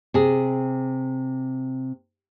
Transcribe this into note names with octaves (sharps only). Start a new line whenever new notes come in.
C3 G#4